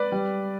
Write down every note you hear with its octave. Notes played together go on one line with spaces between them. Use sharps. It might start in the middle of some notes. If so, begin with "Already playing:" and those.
Already playing: B4 D5
G3